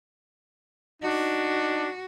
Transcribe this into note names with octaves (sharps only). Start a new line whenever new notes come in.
D4 D#4 F#4